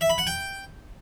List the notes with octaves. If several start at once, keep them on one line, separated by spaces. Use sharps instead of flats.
E5
B5
F#5
G5